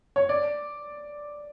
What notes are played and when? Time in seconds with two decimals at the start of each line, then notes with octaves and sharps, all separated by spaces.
0.16 C#5
0.29 D5